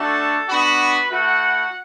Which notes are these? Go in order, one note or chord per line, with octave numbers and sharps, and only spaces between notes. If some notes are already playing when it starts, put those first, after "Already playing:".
Already playing: A3 D4 F#4 A4 A5
B3 D4 F#4 B4 B5
A3 E4 F#4 F#5